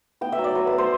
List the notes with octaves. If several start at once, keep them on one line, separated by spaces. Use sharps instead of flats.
B3 G5
E5
F#3
D5
F#3 B4
B4
B3
C5